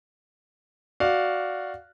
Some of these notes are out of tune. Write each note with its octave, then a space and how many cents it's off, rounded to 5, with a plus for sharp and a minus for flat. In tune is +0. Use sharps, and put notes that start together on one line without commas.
F#4 +0 D5 +0 F5 +0